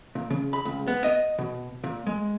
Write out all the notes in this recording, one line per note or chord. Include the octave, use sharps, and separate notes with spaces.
A#2
C#3
B5
C#2
B3
D#5
B2
A#2
G#3